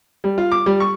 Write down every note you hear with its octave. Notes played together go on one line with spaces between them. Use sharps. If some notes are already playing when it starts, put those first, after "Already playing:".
G3
F4
D6
G3
C#6